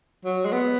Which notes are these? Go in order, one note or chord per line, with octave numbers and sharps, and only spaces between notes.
F#3
G#3
B3